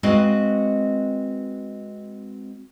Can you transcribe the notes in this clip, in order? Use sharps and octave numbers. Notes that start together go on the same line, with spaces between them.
G#3 C4 F#4 B4 D#5 F5